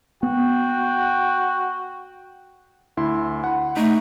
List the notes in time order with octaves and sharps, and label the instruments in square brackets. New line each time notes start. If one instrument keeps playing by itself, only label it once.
[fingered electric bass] B3 [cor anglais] F#4 [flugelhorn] G5
[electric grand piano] D2 E4 C6
F#5 B5
[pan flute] A3 [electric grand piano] D#4